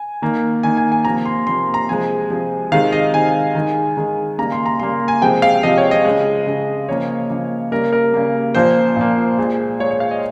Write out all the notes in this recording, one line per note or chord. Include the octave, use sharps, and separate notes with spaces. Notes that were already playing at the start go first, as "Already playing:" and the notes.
Already playing: G#5
D#3 A#3
D#3 A#3 G#5
G#5
G#5
C3 F3 A#3 A#5
C6
C3 F3 A#3 C6
A#5
C3 F3 G#3 G#5
C3 F3 G#3
C3 D#3 G#3 F5
D#5
C3 D#3 G#3 G#5
D#3 G#3
D#3 G#3
C#3 G3 A#3 A#5
C6
A#5
C#3 G3 A#3 C6
G#5
C3 F3 G#3 G5
F5
C3 F3 G#3 D#5
C#5
D#5
C#3 G#3
C#3 G#3
C#3 F3 A#3 C#5
C#3 F3 A#3
C#3 G3 A#3 A#4
A#4
C#3 G3 A#3
A#2 F3 A#3 C5
A#2 F3 A#3
A#2 G#3
A#2 G#3 C#5
C#5
F5
D#5